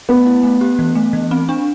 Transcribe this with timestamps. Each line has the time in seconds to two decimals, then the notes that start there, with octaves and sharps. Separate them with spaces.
0.09 A3 B3
0.26 E4
0.43 A3
0.61 G4
0.79 E3
0.95 A3
1.13 E3
1.31 C4
1.49 D4